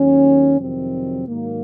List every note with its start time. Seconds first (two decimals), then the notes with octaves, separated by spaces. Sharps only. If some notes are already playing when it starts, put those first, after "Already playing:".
Already playing: D#2 D#3 F#3 C#4
0.59 F2 C3 D#3 F#3 C4
1.27 G#2 D#3 F#3 A#3